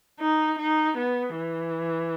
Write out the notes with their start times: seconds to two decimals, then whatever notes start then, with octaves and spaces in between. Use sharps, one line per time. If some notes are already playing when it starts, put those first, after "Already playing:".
0.20 D#4
0.59 D#4
0.97 B3
1.37 E3